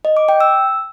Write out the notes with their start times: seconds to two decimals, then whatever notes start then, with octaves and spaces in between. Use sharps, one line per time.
0.05 D#5
0.17 D6
0.29 G5
0.40 E6